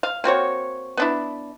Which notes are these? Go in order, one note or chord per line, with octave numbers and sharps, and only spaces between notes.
F5
A#3 C4 F#4 C#5
B3 D4 E4